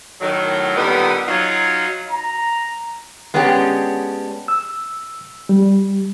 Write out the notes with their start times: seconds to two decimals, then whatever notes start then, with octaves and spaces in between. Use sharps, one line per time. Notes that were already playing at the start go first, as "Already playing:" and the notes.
0.20 A2 D#3 F#3
0.76 A#2 D3 D#3 G3 B3
1.27 F#3 D#4 F4
2.11 A#5
3.34 G#3 B3 C#4 D4 G4
4.48 E6
5.49 G3